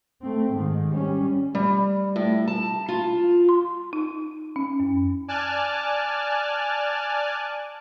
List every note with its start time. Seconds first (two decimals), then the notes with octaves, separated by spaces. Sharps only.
0.22 A3 C4
0.52 G#2 D#3
0.90 G3 C#4
1.55 G3
2.16 A2
2.48 A5
2.89 F4
3.49 C6
3.93 D#4
4.56 C#4
4.80 F#2
5.28 D5 G#5 A5 F6 F#6